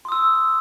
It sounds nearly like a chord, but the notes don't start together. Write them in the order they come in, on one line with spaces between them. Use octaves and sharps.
C6 D#6 E6